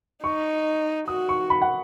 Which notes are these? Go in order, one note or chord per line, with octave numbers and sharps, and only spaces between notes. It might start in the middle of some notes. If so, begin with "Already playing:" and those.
D#4 C#6
F#4 D#6
C#6
B5
F#5